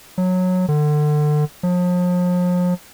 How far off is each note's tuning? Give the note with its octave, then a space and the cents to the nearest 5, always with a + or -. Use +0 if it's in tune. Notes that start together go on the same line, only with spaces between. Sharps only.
F#3 -15
D3 +30
F3 +40